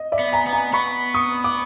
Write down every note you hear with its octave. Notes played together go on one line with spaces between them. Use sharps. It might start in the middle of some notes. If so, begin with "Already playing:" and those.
Already playing: D#5
D5 E5
B3
G#5 A#5
B3
G#5 A#5
B3 B5 C#6
C#6 D#6
D6